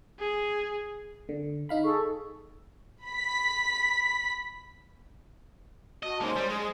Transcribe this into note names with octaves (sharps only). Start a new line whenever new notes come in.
G#4
D3
D#4 F5 B5
G#4 A4 C#6
B5 B6
F#4 D#5 A5
G#3 A#3 C#4 D#4 C5
G3
G#3 G#4 D#6